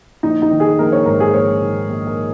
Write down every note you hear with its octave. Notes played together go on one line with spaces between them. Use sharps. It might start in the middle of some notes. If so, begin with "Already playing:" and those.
A#1 D#4
D#4
D#3
G#4
A#1 A#4
C#5
G#2 A#4
G#4
A#1 C#5
D#3
A#1
A#4